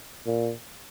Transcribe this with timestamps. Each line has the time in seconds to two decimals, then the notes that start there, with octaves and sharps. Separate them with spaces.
0.26 A#2